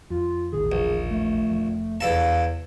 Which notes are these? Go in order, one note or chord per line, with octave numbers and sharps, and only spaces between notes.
F2 F4
D#1 A1 D#3 G#4
A#1
A3
F1 F3
E2 A4 F5 A5